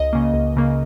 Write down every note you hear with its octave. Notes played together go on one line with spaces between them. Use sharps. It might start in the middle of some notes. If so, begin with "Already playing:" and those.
Already playing: C#2 D#5
C#3 A#3
C#2
C#3 A#3